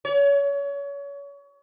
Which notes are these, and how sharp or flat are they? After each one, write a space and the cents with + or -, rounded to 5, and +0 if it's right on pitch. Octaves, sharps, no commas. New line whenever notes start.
C#5 +30